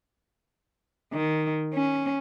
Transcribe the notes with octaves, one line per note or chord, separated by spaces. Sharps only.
D#3
C#4